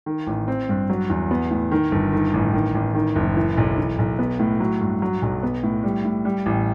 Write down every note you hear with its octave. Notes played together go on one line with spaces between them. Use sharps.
D#3
A1
C4
G2
F#3
E2
B3
A2
D#3
G1
D#3
A1
D#3
A1
D#3
F#1
E3
B1
E3
B1
B3
A2
F#3
G2
F#3
B1
B3
A2
G3
A2
G3
A1